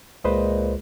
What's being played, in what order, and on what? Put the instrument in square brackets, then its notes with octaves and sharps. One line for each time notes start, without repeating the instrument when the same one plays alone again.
[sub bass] C#2 [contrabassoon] A#2 [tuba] G#3 [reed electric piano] B4 C5 D#5